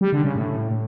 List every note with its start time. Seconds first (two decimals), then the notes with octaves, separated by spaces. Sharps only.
0.01 G3
0.13 D3
0.24 C#3
0.36 A2